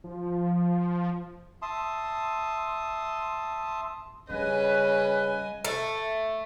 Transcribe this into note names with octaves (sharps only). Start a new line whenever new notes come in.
F3
E5 A5 C6 D#6
C#3 G3 B4 D#5 G#5
A3